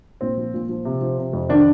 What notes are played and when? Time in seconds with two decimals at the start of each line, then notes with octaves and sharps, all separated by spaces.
0.21 A#2 C4
0.37 F3
0.54 A#2
0.69 F3
0.85 C3
1.01 F3
1.18 C3
1.33 F2
1.49 D#3 D4